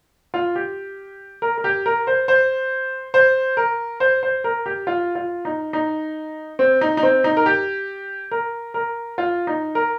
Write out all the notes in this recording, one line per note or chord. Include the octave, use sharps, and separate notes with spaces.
F4
G4
A#4
A#4
G4
A#4
C5
C5
C5
A#4
C5
C5
A#4
G4
F4
F4
D#4
D#4
C4
D#4
D#4
C4
D#4
A#4
G4
A#4
A#4
F4
D#4
A#4